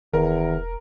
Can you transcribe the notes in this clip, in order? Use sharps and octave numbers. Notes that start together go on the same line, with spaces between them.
E1 E2 D#3 A#4